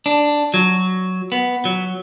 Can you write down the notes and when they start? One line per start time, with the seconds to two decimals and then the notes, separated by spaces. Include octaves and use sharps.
0.06 D4
0.54 F#3
1.32 B3
1.65 F#3